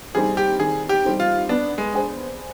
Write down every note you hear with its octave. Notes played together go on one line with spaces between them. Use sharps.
G3 C4 D#4 G#4
G4
D#3 G#4
G4
G3 C4 D#4
F4
B3 D4
G#3
D4 G#4 C5